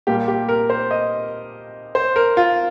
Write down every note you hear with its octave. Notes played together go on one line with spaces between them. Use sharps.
A#2 G3 A#3 G4
G4
A#4
C5
D#5
C5
A#4
F4